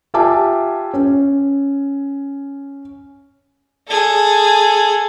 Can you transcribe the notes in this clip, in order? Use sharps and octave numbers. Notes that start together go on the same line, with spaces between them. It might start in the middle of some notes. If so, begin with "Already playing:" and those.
F4 G4 E5 G#5 A5 D6
C#4
G#4 A4